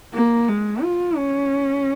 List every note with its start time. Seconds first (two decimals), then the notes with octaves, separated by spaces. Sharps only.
0.14 A#3
0.48 G#3
0.83 F4
1.16 C#4